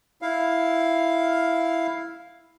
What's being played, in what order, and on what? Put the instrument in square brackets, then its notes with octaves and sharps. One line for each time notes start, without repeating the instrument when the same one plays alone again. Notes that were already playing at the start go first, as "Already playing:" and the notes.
[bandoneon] E4 F5